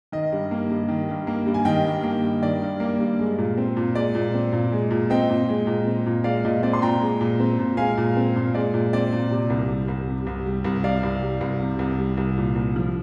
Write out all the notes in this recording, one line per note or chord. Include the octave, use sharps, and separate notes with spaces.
D#3 D#5
G2
A#3
G2
D#3
G2
A#3
G2
G#5
D#3 D#5 G5
G2
A#3
G2
D#3 D5
G2
A#3
G2
G#3
A#2
C4
A#2
G#3 D5
A#2
C4
A#2
G#3
A#2
C4 D#5 G5
A#2
G#3
A#2
C4
A#2
G#3 D5 F5
A#2 D#5
C4 D5
C6
A#2 G5 A#5
G#3
A#2
C4
A#2
G#3 F5 G#5
A#2
C4
A#2
G#3 D5
A#2
C4 D5
A#2
C3
C2
G3
C2
C3
C2
G3
C2
C3 D5 F5
C2
G3
C2
C3
C2
G3
C2
A#2
C2
F3